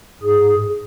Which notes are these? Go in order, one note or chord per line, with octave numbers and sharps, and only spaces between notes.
G#2 G#4